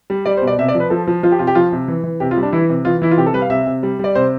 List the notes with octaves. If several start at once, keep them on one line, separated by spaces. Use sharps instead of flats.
G3
G3 D5
C5
B2
D5
C3 E5
D5
F3
B4
F3 A4
F3
F3 F4
G4
C3 F4
G4
F3 F4
C3
E3
E3
C3 G4
F4
G3
D4
E3 E4
C3
E3 F4
E3 E4
F4
C3 G4
A4
G3 B4
F5
C3 E5
C3
G3
G3 D5
C3 C5